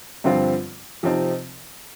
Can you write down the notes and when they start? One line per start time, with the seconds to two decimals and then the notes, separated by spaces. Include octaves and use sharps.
0.24 G2 D3 F3 C4 F4
1.03 C3 F3 C4 D#4